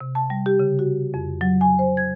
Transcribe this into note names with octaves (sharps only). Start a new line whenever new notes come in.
C3
A5
G3
G4
C#3
F#4
F2
F#3
G#5
C5
G#6